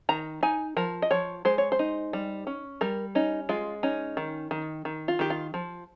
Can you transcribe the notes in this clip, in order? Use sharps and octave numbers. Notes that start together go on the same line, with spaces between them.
D#3 A#5
D#4 G#5
F3 A#4
D#5
F3 C#5
G#3 C5
C#5
C5
D#4
G3
C#4
G3 A#4
C#4 D#4
G#3 F4
C#4 D#4
D#3
D#3
D#3
F4
D#3 G4
F4
F3